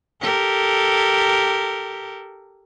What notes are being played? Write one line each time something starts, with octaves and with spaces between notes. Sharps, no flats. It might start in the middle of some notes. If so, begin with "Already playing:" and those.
G4 A4 A#4